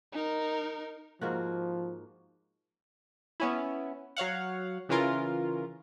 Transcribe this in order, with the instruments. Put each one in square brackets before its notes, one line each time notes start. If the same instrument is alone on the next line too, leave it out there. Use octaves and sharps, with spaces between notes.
[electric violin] D#4 A#4
[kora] G#2 A#3 F#4 [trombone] F3
[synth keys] B3 C#4 E4
F#3 C#5 F5 F#5
C#3 E3 C#4 F4 A#4